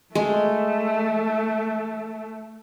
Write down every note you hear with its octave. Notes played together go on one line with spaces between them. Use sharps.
G#3 A3